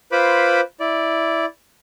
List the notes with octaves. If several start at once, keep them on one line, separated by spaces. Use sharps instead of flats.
F4 B4 C5 B5 D6
E4 D5